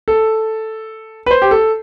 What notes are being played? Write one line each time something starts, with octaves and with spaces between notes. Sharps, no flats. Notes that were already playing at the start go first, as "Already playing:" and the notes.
A4
B4
C5
G4
A4